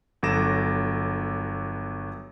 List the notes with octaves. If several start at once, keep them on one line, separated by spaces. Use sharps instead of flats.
G1 F#3 A4 D6 A#6 E7